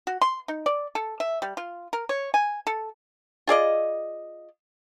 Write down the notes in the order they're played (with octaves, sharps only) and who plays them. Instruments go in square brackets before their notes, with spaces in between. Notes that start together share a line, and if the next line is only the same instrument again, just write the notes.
[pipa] F#4
C6
D#4
D5
A4
E5
G3
F4
A#4
C#5
G#5
A4
F4 G#4 D5 D#5